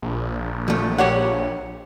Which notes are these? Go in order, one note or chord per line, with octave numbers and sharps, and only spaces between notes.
A#1
F3 A3
G4 C#5 F#5